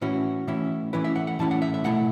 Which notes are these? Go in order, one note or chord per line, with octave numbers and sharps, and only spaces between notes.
A2 E3 C#4 E4 F#4
A2 E3 C#4 E4
A2 E3 C#4 E4 B4
E5
F#5
F#5
A2 E3 C#4 E4 A5
F#5
E5
E5
B2 A3 E4 F#5